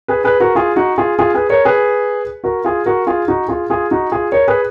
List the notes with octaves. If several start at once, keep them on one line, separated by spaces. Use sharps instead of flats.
G#4 B4
G#4 B4
F#4 A#4
F4 G#4
D#4 F#4
F4 G#4
F4 G#4
G#4 B4
A#4 C#5
G#4 B4
F#4 A#4
F4 G#4
F#4 A#4
F4 G#4
D#4 F#4
F4 G#4
F4 G#4
D#4 F#4
F4 G#4
A#4 C#5
G#4 B4